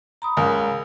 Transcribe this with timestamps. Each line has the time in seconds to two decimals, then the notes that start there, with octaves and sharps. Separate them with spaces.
0.22 A#5 B5 D#6
0.37 C#2 A#4 F5 D#6